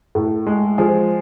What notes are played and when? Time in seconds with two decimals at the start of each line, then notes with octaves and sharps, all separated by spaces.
0.15 A2
0.47 G#3
0.78 F3 G#4